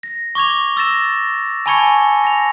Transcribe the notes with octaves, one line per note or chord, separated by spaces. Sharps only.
A#6
C#6 D6 G#6 F7
C#6 E6 A6 A#6 E7
G#5 A5 B5 C#6 G#6 C#7
A#6 F7